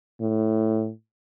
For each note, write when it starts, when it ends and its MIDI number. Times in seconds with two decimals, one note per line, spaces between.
0.21 0.91 45